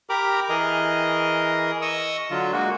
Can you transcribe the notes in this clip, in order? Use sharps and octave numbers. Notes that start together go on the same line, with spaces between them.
G4 A#4 A#5 B5 D6
E3 G#4 A#4 D#5
D#5 C#6 D#6 E6
D3 F#3 F4
G#3 A#3 F#4